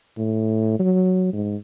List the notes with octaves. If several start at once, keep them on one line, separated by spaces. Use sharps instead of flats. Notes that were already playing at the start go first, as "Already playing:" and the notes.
A2
F#3
G#2